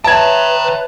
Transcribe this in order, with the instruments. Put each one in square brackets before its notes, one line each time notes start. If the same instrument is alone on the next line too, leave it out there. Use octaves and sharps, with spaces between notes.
[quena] B4 [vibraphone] C#5 E5 [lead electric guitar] G5 A#5 [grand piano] A5 G#6